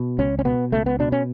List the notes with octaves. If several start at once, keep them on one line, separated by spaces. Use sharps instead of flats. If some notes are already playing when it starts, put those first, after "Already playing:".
Already playing: B2
C#2 C#4
C#4
B2 B3
C#2 A3
B3
B2 D4
C#4